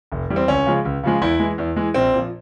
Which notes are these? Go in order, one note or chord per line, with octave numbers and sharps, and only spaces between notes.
F1
E2 E3 G3
C4
C#2 C#4
C#3 F3 G#3
C#2
C#3 F3 G#3
E2 E4
E3 G#3
E2
E3 G#3
A#1 C4
A#2 F3